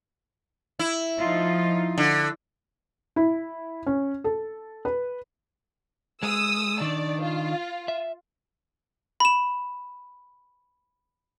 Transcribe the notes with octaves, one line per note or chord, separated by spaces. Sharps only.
E4
F3 D#4 F4
D3
E4
C#4
A4
B4
G#3 D#6 E6
D#3 D4 D5
F4
E5
B5 E7